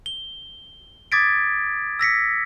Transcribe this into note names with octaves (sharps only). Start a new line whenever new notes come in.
G7
D6 D#6 G#6 A6 B6 D7
E6 A#6 B6 C#7